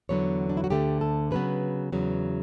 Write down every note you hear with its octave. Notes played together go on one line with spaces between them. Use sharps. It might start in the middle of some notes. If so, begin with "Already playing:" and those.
E2 D3 F#3 B3 C#5
D4
E4
F#4
D2 D3 A3 G4
A4
C#3 F#3 B3 B4
E2 C#3 F#3 B3